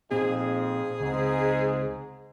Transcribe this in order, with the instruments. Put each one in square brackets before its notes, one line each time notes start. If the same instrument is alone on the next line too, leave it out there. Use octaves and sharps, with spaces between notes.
[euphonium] F2 [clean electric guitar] A#2 C4 D#4 [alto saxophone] G#4
[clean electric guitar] C#2 C4 [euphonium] G#2